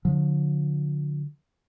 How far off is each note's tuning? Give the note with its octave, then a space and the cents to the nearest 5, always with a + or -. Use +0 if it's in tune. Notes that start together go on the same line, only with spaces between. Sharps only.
D3 +0 F3 +45